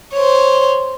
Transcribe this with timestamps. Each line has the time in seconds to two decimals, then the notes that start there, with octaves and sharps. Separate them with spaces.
0.14 C5 C#5